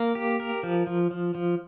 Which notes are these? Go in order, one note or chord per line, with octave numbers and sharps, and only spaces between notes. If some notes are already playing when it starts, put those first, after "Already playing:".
Already playing: A#3 A#4
G4
A#4
F3
F3
F3
F3